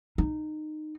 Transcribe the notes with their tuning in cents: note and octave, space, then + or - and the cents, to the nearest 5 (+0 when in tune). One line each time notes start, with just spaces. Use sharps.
D#4 -20